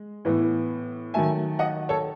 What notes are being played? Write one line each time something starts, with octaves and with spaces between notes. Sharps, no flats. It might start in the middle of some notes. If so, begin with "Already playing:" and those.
Already playing: G#3
A2 E3 B3
D#3 F#3 A3 E5 G#5
D#5 F#5
A4 C#5